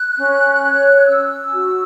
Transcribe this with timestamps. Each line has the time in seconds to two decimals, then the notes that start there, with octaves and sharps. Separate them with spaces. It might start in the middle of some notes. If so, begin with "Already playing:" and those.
Already playing: F#6
0.17 C#4
0.63 C#5
0.98 F#6
1.07 C#4 E6
1.52 F#4